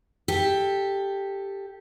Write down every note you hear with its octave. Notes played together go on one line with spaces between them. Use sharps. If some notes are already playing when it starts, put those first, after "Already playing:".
G4 A4